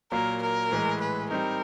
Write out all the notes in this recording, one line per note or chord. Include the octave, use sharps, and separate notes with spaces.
A#2 F#3 A#3 A#4
A#4
A2 E3 G#3
B4
G3 C4 D#4 A#4